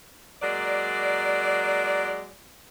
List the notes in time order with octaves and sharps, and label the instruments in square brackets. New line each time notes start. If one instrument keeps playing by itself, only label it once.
[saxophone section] F#3 G#3 A#3 D5